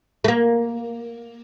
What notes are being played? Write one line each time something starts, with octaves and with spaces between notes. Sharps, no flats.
A3
A#3